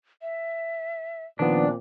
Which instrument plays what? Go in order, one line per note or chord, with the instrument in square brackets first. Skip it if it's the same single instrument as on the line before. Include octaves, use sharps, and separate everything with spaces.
[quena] E5
[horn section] A#2 C4 D5 [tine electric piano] D#3 F3 B3 [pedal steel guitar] D4